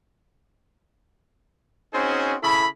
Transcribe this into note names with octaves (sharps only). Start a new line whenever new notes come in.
C4 C#4 D#4 F#4 G#4 C5
C#3 E4 A4 B5